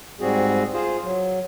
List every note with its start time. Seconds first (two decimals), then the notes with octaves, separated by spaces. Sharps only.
0.20 G#2 G3 C4 F#4 G#4
0.73 F4 G#4 C5
1.04 F#3